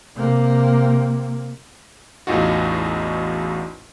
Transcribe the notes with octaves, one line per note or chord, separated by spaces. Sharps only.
C3 A#3
A1 E2 D#4 F4 F#4